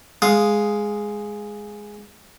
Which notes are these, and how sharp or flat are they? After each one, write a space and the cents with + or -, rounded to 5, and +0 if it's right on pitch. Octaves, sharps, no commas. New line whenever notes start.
G#3 +0 F5 +0 D#6 +0